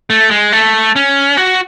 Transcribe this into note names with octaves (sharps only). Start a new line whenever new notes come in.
A3
G#3
A3
C#4
F#4